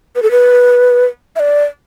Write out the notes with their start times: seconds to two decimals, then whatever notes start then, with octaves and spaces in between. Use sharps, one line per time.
0.16 B4
0.22 A4
0.31 B4
1.36 E5
1.40 D5